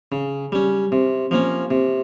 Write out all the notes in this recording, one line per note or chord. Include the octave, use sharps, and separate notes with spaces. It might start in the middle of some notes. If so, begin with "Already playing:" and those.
C#3
G3 C#4
C3
F3 A#3 C#4
C3